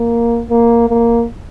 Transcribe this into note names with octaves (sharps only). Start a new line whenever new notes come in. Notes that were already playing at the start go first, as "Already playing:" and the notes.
Already playing: A#3
A#3
A#3